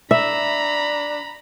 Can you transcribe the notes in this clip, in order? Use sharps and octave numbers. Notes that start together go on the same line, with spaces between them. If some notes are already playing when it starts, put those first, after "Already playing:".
D4 E5 A#5 B5